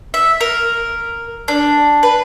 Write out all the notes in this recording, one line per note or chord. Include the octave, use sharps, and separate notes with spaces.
E5
A#4
D4
B4